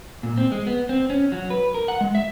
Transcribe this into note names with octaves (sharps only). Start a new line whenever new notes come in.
A#2
C4
G#3
B3
C4
C#4
F#3
B4
A#4
F#5
G#3
E5